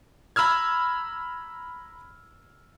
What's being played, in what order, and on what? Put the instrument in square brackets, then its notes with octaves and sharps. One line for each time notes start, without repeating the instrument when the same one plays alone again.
[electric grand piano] A#5 B5 E6 F6 G#6